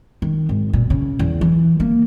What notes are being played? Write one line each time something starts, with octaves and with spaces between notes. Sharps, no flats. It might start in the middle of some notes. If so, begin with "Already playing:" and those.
D#3
G#1
A#2
C#3
E2
E3
A#3